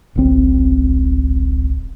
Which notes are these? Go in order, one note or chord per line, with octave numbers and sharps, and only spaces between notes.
D1 G#1 C#2 C4